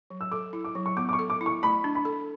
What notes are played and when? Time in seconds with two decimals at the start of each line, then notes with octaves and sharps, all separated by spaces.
0.10 F#3
0.21 E6
0.32 A4 D6
0.53 E4
0.64 D6
0.75 F#3
0.86 C#6
0.97 B3 D6
1.09 D6
1.13 C#6
1.19 A4
1.30 D6
1.41 E4
1.46 C#6
1.63 A3 B5
1.84 D4
1.95 B5
2.05 A4